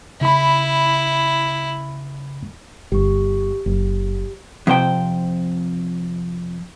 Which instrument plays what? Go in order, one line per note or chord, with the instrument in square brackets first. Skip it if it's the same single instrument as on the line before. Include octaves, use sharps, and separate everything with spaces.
[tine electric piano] C#3 B5 [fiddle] E4
[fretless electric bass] G1 [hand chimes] G4 C#6
[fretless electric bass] F#1 [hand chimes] G4
[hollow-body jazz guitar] F2 C3 C5 G5